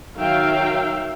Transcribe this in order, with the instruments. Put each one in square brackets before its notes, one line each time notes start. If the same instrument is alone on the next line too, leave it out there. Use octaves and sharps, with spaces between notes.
[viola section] D#3 F#3 E5 F5 G5